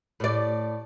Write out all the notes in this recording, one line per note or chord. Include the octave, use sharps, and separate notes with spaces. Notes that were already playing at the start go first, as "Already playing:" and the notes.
A2 D5